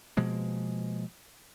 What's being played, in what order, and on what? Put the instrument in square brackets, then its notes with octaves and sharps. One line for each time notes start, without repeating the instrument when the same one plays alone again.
[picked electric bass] B2 F3 G#3 A#3